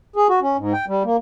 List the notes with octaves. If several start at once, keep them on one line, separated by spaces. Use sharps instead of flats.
G#4
F#4
C#4
G#2
G5
G3
A#3